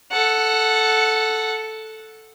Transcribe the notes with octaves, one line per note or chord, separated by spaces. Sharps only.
A4 F#5